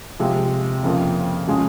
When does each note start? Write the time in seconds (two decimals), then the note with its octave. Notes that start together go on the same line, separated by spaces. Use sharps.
0.19 C3 F3 G#3
0.83 F2 C#3 F3 A#3
1.47 C#3 F3 G#3 C#4